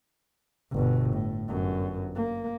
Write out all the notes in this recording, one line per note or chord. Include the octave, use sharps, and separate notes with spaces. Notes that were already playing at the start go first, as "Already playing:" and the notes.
G1 B2
A2
G1 F#2
A#3